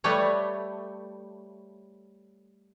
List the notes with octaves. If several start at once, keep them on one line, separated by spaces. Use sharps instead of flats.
G3 A3 B4 C#5